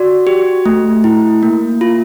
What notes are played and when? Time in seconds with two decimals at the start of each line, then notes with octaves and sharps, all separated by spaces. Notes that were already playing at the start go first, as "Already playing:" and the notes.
Already playing: F#4 D5
0.27 G4
0.66 A3
1.04 E4
1.43 A#3
1.81 F4